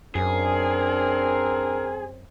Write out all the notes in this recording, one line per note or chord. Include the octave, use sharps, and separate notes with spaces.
F#2 C4 D4 G#4 A#4